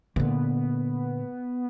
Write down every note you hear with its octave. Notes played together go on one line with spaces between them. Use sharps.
A#2 D3 B3